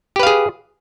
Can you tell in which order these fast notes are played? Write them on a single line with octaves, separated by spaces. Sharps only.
G4 B4 F5 G#4